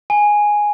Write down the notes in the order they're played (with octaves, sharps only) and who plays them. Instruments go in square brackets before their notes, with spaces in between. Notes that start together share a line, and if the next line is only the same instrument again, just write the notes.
[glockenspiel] G#5